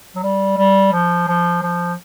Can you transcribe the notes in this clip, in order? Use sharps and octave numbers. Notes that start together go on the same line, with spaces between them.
F#3
G3
G3
F3
F3
F3